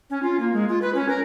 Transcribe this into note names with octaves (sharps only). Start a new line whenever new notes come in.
C#4
F4
A#3
G#3
F4
B4
C#4
A#4